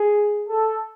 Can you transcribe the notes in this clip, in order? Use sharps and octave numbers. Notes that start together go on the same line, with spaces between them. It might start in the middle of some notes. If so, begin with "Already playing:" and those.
Already playing: G#4
A4